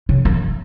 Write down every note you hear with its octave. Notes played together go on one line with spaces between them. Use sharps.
C#3
F#2